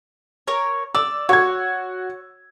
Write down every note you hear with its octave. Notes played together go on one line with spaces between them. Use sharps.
A#4 C#5
D5 E6
F#4 C#5 G#6